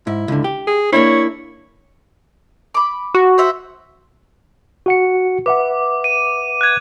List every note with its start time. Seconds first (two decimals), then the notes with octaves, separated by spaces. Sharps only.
0.07 G#2 E4
0.28 C#2 D3
0.44 G4
0.67 G#4
0.93 A#3 D4 E4 C#5
2.74 B5 D6
3.15 F#4
3.38 C5 E5 F#5
4.86 F#4 F#5 C#7
5.46 B4 E5 F#5 D6
6.04 D#7
6.61 F#6 G#6